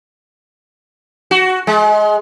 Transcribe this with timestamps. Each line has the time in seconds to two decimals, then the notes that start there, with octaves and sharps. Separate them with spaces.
1.31 F#4
1.67 G#3